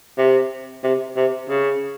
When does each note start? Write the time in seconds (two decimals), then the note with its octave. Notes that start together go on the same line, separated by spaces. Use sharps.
0.18 C3
0.84 C3
1.16 C3
1.50 C#3